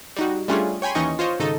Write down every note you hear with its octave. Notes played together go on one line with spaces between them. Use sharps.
G3 D#4 F#4
G3 A3 C#4 D4 F4 G#4
C#5 G5 G#5 B5 C6
D#2 E3 C#4 D#4 D#5 C#6
F4 C5 C#5 D#5
G#1 C#3 D#4 A4 D#5